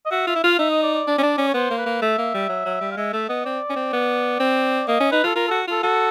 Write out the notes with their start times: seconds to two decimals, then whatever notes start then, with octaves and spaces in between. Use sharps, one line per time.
0.06 D#5
0.11 F#4 E5
0.27 F4 E5
0.36 E4
0.43 F4 F5
0.59 D#4 E5
0.71 D#5
0.83 D5
0.95 D5
1.08 D4
1.18 C#4
1.23 D4
1.38 C#4
1.48 C#5
1.54 B3 C5
1.71 A#3
1.78 B4
1.86 A#3
2.02 A3 E5
2.18 A#3
2.35 G3
2.49 F#3
2.66 F#3
2.81 G3
2.91 F5
2.97 G#3 E5
3.13 A3 E5
3.29 B3 D#5
3.44 C4 D5
3.70 C#4
3.76 C4
3.93 B3
4.40 C4
4.88 A#3 D#5
5.00 C#4
5.11 D#4 B4
5.24 F4 A4
5.36 F4 A#4
5.48 F#4 A4
5.68 F4 A4
5.83 F#4 A4